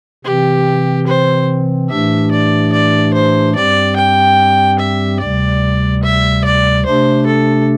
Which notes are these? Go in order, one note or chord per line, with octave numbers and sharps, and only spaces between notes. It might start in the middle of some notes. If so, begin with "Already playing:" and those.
C3 E3 C4 G4
C5
A2 E3 A3 D4 G4 E5
D5
D5
C5
G2 G3 C4 G4 D5
G5
E5
D2 C3 G3 D5
E5
D5
C3 A3 D4 G4 C5
A4